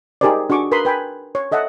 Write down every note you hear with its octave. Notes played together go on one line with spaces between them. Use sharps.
D#4 G4 G#4 A#4 C5 D5
D4 F#4 G#4 C#6 D6
A#4 B4 B5 C6 D#6
B4 G5 G#5 B5
C#5
A4 D#5 E5 F#5 A5